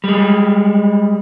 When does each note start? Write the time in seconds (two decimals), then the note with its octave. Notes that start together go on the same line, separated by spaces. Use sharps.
0.04 G3 G#3